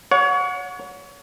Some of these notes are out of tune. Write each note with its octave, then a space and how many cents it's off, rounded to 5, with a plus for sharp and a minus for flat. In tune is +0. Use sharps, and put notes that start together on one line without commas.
C#5 +30 F#5 -25